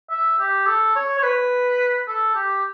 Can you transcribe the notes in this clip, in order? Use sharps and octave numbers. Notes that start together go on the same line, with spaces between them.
E5
G4
A4
C#5
C#5
B4
A4
G4